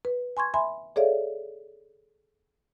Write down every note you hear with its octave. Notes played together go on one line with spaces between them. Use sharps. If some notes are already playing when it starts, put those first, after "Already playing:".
B4
G#5 C6 C#6 G#6
E5 G#5 B5 C6
G#4 A4 C#5 D5 E5 F5